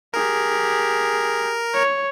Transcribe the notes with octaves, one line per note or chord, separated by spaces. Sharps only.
G4 G#4 A#4
C#5